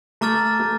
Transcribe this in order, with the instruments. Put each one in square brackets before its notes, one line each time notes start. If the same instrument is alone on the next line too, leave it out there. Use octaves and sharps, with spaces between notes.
[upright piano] A3 [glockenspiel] A#5 D6 F6 A6
[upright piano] A3